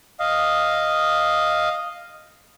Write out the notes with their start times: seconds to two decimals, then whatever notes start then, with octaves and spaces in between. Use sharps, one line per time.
0.20 D#5 F5